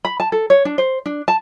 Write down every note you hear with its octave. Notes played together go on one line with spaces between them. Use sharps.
B5
A5
A4
C#5
D4
C5
D4
A5